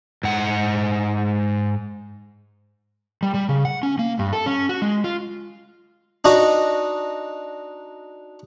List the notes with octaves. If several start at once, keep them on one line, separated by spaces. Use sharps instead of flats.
G#2 F#5
G3
G3
C#3
F#5
C#4
A#3
G2
A4
C#4
F#4
G#3
F4
D4 D#4 F#4 D#5